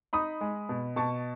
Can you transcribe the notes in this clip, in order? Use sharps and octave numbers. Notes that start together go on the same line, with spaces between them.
D#4 B5 D#6
G#3
B2
B2 A5 C#6